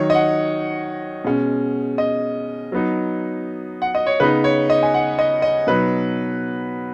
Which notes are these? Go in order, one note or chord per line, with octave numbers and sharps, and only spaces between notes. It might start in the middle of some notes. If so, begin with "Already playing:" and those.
Already playing: D#3 F#3 D#4 C#5
D#5
F#5
B2 G#3 C#4
D#5
F#3 B3 D#4
F#5
D#5
C#5
C#3 B3 D#4 B4
C#5
D#5
G#5
F#5
D#5
D#5
B2 F#3 D#4 B4